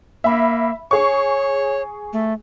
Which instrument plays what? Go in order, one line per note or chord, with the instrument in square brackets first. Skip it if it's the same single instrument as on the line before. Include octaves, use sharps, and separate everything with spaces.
[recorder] A#3 [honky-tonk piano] E5 B5
[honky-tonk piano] G#4 C#6 [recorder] C#5
[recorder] A3